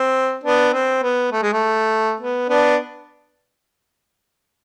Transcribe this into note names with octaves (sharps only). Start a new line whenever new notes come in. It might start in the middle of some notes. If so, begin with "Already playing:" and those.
Already playing: C4
B3 D4
C4
B3
A3
G#3
A3
B3
B3 D4